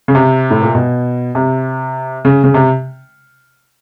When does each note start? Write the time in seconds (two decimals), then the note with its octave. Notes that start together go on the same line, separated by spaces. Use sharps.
0.08 C#3
0.15 C3
0.50 A2
0.63 A#2
0.75 B2
1.35 C3
2.25 C#3
2.44 C#3
2.54 C3